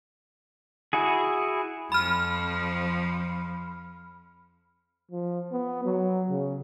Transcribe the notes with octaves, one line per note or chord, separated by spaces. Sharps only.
E4 F#4 G#4
F2 F3 B5 F6
F3
B3
F#3
C#3